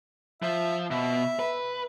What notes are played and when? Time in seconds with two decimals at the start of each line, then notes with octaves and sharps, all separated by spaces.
0.42 F3 E5
0.90 B2 E5
1.39 B4